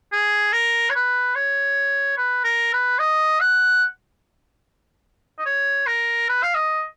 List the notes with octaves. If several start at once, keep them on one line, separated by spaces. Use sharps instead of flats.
G#4
A#4
C#5
B4
C#5
B4
A#4
B4
D#5
F#5
D#5
C#5
A#4
B4
F5
D#5